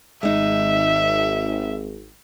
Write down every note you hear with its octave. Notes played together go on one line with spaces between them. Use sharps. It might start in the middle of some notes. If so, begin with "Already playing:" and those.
G#1 G#3 D#4 E5